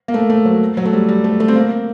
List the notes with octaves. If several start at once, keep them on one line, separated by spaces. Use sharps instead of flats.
A#3
A3
A3
F#3
F#3
A3
G3
G3
A3
A3
C4
A#3